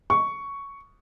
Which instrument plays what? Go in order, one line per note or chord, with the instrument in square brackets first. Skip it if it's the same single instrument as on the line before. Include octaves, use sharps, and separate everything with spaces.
[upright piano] C#6